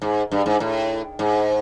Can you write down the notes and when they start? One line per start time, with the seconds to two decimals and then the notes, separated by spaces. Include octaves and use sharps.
0.02 G#2
0.31 G2
0.46 G#2
0.60 A2
1.19 G#2